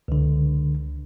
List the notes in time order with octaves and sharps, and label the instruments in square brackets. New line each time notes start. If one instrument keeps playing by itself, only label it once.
[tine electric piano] C#2 D3